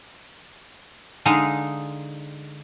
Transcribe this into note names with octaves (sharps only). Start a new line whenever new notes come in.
D3 G#3 D#4 F5